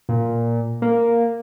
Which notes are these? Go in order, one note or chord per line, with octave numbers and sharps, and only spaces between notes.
A#2
A#3